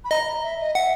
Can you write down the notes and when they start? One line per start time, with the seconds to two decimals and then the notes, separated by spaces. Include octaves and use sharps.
0.04 B5
0.11 D#5 A#5
0.43 E5
0.60 D#5
0.75 E5 F#5